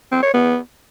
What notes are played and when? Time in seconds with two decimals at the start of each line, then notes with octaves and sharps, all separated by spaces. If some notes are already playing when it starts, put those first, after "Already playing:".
0.12 C4
0.23 C#5
0.34 B3